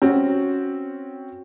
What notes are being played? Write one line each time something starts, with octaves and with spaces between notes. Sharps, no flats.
C4 C#4 F#4